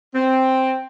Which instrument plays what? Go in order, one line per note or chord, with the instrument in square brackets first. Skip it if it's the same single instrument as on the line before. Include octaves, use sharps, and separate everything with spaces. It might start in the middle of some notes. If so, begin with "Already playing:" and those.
[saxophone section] C4